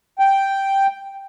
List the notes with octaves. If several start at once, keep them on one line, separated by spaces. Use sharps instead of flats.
G5